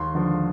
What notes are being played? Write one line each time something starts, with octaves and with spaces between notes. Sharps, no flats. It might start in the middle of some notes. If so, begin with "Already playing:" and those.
Already playing: D#2 C6
D3 F3